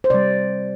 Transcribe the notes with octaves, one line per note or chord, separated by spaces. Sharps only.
C5
C3 G3 D5